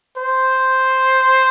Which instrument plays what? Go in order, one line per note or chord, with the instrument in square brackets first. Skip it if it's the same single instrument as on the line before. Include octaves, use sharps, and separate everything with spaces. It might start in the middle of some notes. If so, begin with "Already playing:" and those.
[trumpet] C5